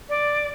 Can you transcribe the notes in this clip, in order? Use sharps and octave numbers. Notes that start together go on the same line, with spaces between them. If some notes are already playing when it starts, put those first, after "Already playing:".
D5